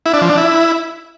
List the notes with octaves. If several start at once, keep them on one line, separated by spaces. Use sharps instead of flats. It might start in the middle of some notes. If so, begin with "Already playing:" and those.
E4
D4
F3
D4
E4